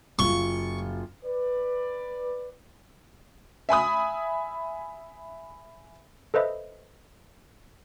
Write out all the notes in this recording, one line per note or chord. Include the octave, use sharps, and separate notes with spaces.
F#1 F4 C#6 G7
B4 D5
E5 G#5 B5 D#6
A4 B4 C5 D#5 E5 B5